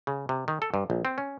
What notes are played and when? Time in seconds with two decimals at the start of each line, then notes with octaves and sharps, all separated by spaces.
0.07 C#3
0.29 C3
0.48 D#3
0.62 A4
0.74 G2
0.90 A#1
1.05 C4
1.18 C#4